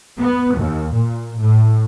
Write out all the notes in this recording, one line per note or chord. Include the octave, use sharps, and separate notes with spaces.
B3
D#2
A#2
A2